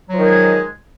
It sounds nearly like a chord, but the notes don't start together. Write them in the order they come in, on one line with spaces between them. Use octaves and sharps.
F#3 F3 D#3 G#4 G#3